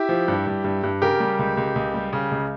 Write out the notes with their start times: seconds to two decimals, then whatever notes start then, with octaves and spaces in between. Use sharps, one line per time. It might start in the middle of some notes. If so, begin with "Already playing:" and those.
Already playing: E4 G4
0.09 F3
0.28 G2
0.47 G2
0.64 G2
0.83 G2
1.02 C#3 G4 A#4
1.20 G3
1.39 C#2
1.57 C#2
1.76 C#2
1.94 G3
2.13 C#3
2.31 C#2